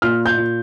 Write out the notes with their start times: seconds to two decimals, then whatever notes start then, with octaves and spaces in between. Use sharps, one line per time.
0.02 A#2 F6
0.26 G6
0.37 A#2